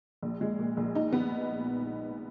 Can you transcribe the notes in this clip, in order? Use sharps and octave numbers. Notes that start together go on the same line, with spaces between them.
A#1
G#3
A#2
A#1
D#4
B3